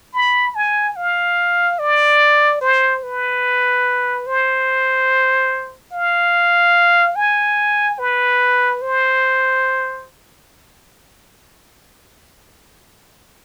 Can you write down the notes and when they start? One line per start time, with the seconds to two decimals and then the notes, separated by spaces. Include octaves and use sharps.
0.13 B5
0.55 G#5
0.96 F5
1.79 D5
2.61 C5
3.03 B4
4.27 C5
5.92 F5
7.16 G#5
7.99 B4
8.82 C5